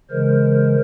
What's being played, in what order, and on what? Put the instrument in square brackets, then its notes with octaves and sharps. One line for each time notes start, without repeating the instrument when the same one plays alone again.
[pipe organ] C#3 E3 G#3 A#4 C5